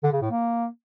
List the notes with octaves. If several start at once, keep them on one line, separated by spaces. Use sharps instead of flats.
D3
C#3
A2
A#3